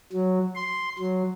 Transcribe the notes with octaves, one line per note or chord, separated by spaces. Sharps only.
F#3
C6
F#3